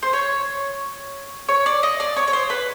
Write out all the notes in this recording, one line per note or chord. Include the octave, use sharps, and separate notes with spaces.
C5
C#5
C#5
D5
D#5
D5
C#5
C#5
C5
B4